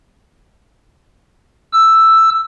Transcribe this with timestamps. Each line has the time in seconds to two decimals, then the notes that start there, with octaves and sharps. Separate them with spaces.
1.73 E6